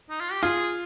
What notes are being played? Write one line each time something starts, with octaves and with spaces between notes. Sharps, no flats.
D#4
F4
G4
F4 G#4